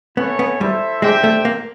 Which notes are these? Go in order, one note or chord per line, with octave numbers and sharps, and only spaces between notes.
B3 C#4 E4 A4 C#5
B3
G3 E4 A4 C5 E5
G#3 D4 G4 C5 E5 G5
A3
A#3